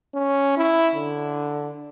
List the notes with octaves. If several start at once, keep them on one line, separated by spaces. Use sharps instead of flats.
C#4
E4
D3